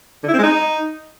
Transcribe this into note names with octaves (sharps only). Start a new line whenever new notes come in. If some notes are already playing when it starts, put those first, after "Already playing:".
D3
E4
C4
G#3
D#4